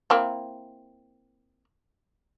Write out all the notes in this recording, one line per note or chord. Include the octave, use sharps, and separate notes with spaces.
A#3 C4 E4